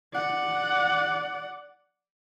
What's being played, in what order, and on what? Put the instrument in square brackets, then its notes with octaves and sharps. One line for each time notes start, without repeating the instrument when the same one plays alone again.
[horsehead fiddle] D5 F#5